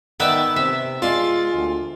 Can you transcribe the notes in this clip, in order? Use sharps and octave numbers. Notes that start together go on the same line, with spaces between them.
D#3 B3 D5 E5 F#5 G5 A5
C3 E5
G#3 F4 D5 A5 C6
D2